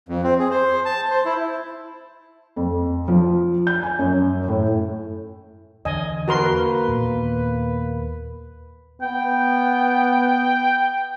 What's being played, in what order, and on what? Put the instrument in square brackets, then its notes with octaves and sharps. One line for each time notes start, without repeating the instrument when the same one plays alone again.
[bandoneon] F2
C4
G#4
C5
A5
C5
E4
[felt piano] F2
F3
G6
G#5
F#2
A2
[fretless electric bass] E2 D3 [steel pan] D#5 G#5
[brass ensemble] A#3 B4 [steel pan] F#4 A#4 C6
[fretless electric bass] D#2 A#2 B3
[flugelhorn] B3 [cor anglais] G5